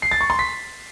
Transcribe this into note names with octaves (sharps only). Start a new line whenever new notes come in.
C7
A6
C#6
C6
B6